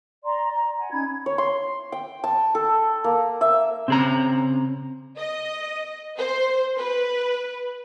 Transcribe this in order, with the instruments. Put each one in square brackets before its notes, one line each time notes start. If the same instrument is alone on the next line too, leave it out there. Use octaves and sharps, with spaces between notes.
[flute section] D5 A#5 C6
A#5
F#5 G#5
C#4 D#4 B5 G#6
[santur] C#5
C6
G5
A5
A4
A#3
E5
[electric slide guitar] C#3 [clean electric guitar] C4 G#4 A#5
[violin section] D#5
C5
B4